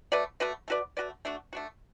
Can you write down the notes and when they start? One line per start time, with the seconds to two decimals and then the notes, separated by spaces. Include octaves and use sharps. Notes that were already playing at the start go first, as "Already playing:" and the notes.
0.12 A3 F#4 B4 D5
0.40 A3 F#4 B4 D5
0.68 A3 F#4 B4 D5
0.97 A3 F#4 B4 D5
1.25 A3 D4 F#4
1.53 A3 D4 F#4